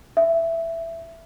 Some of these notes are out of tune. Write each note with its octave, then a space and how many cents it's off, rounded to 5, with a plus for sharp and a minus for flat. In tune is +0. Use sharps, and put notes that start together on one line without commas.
E5 +10